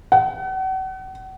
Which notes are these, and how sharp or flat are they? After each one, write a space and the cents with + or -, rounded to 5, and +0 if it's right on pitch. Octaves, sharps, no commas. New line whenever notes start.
F#5 +40